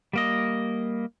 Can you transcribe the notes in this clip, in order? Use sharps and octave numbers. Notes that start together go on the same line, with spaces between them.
G3 A#3 D#5